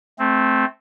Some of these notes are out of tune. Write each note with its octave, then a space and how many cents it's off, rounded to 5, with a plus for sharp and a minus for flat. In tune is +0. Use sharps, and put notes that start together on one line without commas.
A3 -15 C4 +0